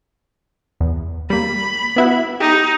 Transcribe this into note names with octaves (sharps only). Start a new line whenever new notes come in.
E2
G3 A#3 B5
B3 E4 F#4
D#4 G4